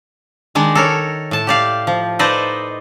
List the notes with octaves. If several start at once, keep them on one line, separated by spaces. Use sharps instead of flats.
D#3 G#3 D4
A4 A#4 C#5
A2 A5
G4 D5 F5
F3
D#4 A4 B4 C5 D5 D#5